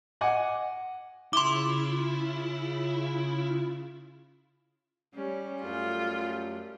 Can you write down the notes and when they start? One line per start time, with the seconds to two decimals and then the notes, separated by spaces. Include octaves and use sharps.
0.21 D#5 F#5 G#5 D6
1.33 C#3 E4 F4 C6 D6
5.14 G3 C#4
5.63 F#2 A3 F4 A4